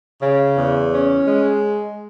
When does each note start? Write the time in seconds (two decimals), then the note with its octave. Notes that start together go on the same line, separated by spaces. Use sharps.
0.21 C#3
0.57 E2
0.92 C#4
1.27 G#3